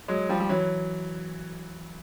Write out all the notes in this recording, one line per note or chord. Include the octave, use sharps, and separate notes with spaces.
F#3 G#3
F3 G3
G3
E3 F#3